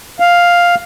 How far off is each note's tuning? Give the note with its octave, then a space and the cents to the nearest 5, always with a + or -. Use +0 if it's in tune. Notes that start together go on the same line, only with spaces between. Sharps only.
F5 +5